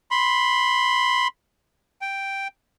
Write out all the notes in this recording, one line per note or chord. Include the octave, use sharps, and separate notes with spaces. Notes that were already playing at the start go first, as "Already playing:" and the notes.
B5 C6
G5